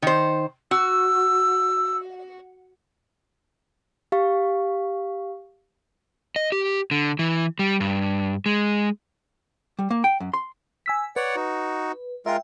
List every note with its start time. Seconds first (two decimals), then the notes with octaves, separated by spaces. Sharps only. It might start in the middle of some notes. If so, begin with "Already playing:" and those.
0.02 D#3 C5
0.71 F#4 E6
4.12 G4 F5 C#6
6.36 D#5
6.52 G4
6.91 D3
7.19 E3
7.59 G3
7.80 G2
8.46 G#3
9.79 G3
9.91 A#3
10.04 G5
10.20 F#2
10.34 C6
10.86 G#5 E6 B6
11.16 B4 C#5 D5 F#5
11.36 D#4 F#4
12.26 G#3 F4 A#4 E5 G5